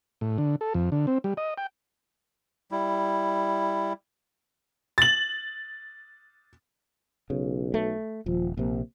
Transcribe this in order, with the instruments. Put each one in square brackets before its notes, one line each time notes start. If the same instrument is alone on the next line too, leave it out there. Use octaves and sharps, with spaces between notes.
[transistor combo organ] A2
D3
A4
F2
D3
C4
G3
D#5
G5
[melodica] G3 E4
[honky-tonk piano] A6 F#7
[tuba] B1 [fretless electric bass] C#3
[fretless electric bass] A3
[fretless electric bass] D#1 [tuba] F3
[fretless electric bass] A#1 C3 [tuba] A#3